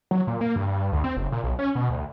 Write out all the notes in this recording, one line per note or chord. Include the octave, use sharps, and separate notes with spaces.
F#3
A#2
A#3
G2
D2
C4
F#1
A#2
B1
C#4
B2
D2